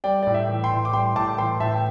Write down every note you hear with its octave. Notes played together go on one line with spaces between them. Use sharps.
G3 D5 G5
A2 D5
E5
E3
G5 C6
A2
D6
G3 G5 C6
A2 A5 D6
E3 G5 C6
A2 E5 A5
G5